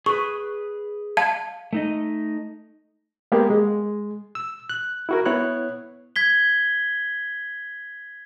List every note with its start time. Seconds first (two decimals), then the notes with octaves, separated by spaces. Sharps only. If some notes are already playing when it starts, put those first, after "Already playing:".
0.06 G#4 B4 C#6
1.17 F5 A5 G#6
1.73 A3 D#4 D#5
3.32 G#3 A#3 B3 G4 G#4
3.50 G#3
4.35 E6
4.70 F#6
5.09 E4 F#4 A#4
5.26 B3 E4 C#5 F#6
6.16 G#6 B6 G7